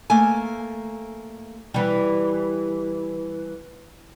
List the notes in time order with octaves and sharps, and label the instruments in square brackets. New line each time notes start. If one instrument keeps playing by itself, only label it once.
[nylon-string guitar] A3 A#3 A4 G#5
[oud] E3 G3